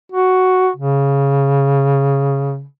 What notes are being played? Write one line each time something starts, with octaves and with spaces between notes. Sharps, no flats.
F#4
C#3